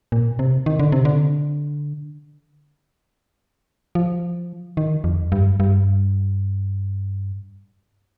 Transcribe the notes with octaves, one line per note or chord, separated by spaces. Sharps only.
A#2
C3
D#3
D3
C3
D3
F3
D#3
F2
G2
G2